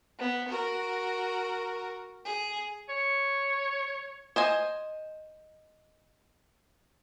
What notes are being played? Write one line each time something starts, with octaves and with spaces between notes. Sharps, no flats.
B3
F#4 A#4
G#4
C#5
C5 D#5 G#5